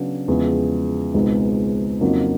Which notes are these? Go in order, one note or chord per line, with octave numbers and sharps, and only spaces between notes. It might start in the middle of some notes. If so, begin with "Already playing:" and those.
Already playing: C#3 F#3 B3 D4
E2 C#3 F3 G#3
C#2 B2 G#3 C4 D#4
F2 C#3 F#3 A#3 D#4